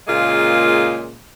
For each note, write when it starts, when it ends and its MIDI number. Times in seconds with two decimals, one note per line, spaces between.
0.08 1.17 46
0.08 1.17 49
0.08 1.17 56
0.08 1.17 58
0.08 1.17 65